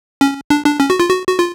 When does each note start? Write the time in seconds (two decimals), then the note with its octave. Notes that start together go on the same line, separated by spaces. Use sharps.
0.21 C#4
0.50 D4
0.65 D4
0.80 C#4
0.90 F#4
1.00 F4
1.09 F#4
1.27 F#4
1.39 F4